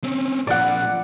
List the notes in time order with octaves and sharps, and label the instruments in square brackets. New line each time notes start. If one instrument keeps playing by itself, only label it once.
[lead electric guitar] C4 C#4
[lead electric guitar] A#2 F3 [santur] D5 F#5